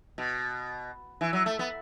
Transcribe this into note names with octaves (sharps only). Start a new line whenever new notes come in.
B2
E3
F#3
A3
B3